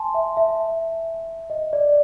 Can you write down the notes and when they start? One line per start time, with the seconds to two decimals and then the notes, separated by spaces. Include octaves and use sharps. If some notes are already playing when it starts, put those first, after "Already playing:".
Already playing: G#5 A5 C6
0.14 E5
0.37 E5
1.50 D#5
1.73 D5